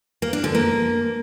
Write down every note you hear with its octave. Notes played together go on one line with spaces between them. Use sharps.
A#3
D4
D3
A#3